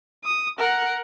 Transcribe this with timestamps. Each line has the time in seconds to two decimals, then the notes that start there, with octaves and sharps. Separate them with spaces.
0.24 D#6
0.59 A#4 F#5